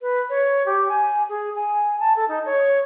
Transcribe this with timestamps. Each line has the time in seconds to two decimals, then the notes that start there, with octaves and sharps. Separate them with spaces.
0.01 B4
0.30 C#5
0.66 G4
0.89 G#5
1.29 G#4
1.55 G#5
2.00 A5
2.16 A4
2.28 D#4
2.46 C#5